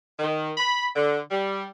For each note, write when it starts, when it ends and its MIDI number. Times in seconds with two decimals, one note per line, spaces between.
0.19 0.51 51
0.58 0.88 83
0.96 1.20 50
1.31 1.65 55